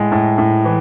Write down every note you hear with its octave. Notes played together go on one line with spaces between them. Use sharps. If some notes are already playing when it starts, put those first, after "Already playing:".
Already playing: A2 G#3
A2
A2
E3